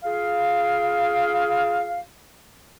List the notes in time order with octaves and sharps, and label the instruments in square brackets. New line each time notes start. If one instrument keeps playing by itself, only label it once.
[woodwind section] F4 G#4 F5